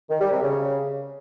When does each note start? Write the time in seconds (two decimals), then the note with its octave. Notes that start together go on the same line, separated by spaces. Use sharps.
0.10 D#3
0.21 G3
0.32 C3
0.42 C#3